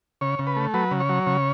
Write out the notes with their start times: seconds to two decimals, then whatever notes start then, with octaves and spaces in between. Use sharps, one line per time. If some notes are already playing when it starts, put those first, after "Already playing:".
0.21 C#3 C#5
0.39 C#3
0.47 B4
0.57 A3
0.74 F#3 B4
0.91 C#3
1.00 C#5
1.09 F#3
1.27 C#3